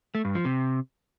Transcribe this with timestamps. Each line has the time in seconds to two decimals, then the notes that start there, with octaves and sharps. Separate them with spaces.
0.15 A3
0.25 G2
0.35 F3
0.45 C3